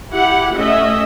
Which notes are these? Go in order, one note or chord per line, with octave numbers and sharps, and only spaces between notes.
E4 G4 F#5
A3 C#4 D#5 E5